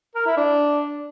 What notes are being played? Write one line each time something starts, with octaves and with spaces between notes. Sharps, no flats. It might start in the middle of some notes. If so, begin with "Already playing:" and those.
A#4
E4
D4